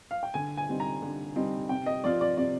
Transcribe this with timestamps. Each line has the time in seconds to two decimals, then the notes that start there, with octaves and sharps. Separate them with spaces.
0.11 F5
0.23 G5
0.34 D3 G#5
0.57 G#5
0.69 G3 C4 D#4
0.80 A#5
1.02 D3
1.36 G3 C4 D#4
1.69 C3 G5
1.86 D#5
2.04 F3 C4 F4 D5
2.21 D5
2.37 C3 D5